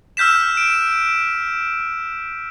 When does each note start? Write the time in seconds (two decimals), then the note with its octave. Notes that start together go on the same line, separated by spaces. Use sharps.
0.17 E6 F6 G6 B6 E7
0.57 D7